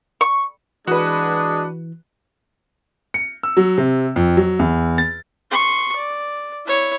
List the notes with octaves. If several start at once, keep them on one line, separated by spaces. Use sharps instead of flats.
C#6
E3 G#3 D4 F#4 B4
C#7
E6
F#3
C3
F2
F#3
E2
A6
C6 C#6
D5
E4 C#5